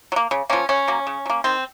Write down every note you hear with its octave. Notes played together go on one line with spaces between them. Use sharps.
F#3
A#3
C#3
F3 A#3 C#4
C#3 C#4
F#3 A#3
C#3
F#3
A#3
D#3 C4